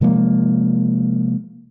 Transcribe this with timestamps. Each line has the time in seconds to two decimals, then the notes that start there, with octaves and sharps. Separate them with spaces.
0.01 C3 F3 G#3 A#3